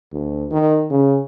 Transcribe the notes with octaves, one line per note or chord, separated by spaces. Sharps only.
D2
D#3
C#3